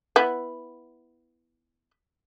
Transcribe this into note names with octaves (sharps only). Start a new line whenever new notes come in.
B3 E4